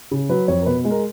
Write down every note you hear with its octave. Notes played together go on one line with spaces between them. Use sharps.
C#3
F#3 B4
F2 C#5
A#4
B2 B4
G#3
A#4